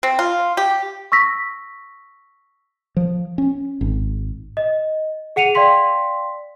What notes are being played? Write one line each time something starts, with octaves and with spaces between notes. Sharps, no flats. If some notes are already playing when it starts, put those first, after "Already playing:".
C4
F4
G4
C#6 E6 A#6 B6
F3
C#4
G#1
D#5
G#4 F#5 C#7 D#7 F7
D5 F5 G5 C6 B6